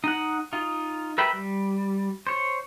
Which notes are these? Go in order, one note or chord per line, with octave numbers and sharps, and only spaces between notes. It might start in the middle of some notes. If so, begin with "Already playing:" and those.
D#4 F#5
D#4 F4
A#4 B4 E5 G5 B5
G3
C5 C#5